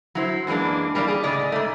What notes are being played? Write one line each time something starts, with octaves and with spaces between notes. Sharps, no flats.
F#3 E4 C5
F#2 E3 G#3 A#3 D4
G3 A#3 D4 E4 D5
G#4
A2 C#3 D5 D#5
G#2 A3